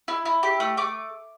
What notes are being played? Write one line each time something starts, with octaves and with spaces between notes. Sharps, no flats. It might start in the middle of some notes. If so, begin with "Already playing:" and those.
E4
E4
G4
A3
A3 D6